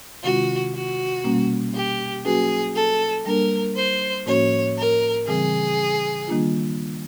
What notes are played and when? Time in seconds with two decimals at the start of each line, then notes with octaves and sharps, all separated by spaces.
0.24 C3 D#3 G#3 C#4 F4 F#4
0.74 F#4
1.24 B2 G3 A#3 C#4
1.74 G4
2.25 F#3 A#3 C#4 F#4 G#4 B4
2.75 A4
3.26 G3 A#3 D4 A#4
3.77 C5
4.26 A2 F3 A#3 C#4 F#4 C#5
4.78 A#4
5.27 C#3 E3 G3 C4 G#4
6.28 D#3 G3 A#3 D4 F4